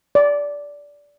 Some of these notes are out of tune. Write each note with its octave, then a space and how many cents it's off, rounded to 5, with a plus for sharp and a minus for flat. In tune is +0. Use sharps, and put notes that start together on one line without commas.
D5 -15